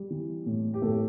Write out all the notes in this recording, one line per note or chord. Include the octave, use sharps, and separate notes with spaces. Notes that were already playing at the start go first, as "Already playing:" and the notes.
Already playing: G3
E3
A2
G4
A2 A4